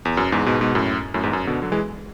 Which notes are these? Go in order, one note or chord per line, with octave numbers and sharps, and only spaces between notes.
E2
F#2
E2 G#2
G#2 B2
G#2 B2
F#2 A2
F#2 A2
E2 G#2
F#2
B2 D3
D3 F#3
E3 G#3